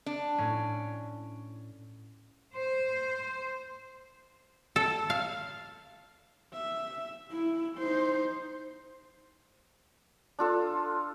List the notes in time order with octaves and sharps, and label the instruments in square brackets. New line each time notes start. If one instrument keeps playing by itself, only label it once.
[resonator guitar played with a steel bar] D4
[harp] A2 C#4
[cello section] C5
[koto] A4
F5
[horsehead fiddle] E5
E4
D#4 C5
[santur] D4 F4 A4